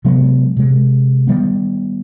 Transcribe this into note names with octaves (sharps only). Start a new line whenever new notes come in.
C3 F#3 G#3 B3
C3 G#3
D#3 G3 B3